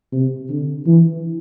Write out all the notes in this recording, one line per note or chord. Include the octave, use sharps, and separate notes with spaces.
C3
D3
E3